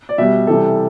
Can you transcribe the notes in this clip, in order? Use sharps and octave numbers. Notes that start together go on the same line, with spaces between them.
D5
B2 G3 E5
C3 E3 G3 A4